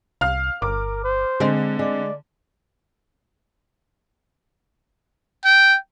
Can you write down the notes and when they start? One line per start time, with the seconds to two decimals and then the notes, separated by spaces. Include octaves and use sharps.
0.21 C2 F5 F6
0.62 G1 A#4 D6
1.04 C5
1.40 D3 G#3 C4
1.79 G#3 D5
5.45 G5